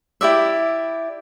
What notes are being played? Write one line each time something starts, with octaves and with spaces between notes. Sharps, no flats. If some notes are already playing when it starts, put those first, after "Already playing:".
E4 G4 D5 E5